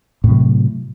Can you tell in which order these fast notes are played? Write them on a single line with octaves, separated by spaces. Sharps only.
A2 C3 F#3